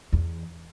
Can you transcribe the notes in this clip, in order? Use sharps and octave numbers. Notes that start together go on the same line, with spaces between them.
E2